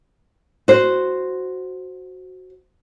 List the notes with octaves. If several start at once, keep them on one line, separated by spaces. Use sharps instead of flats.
F#4 C5